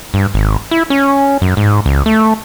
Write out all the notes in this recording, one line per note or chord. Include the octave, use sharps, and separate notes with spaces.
G2
G#1
E4
C#4
F#2
G#2
C#2
A3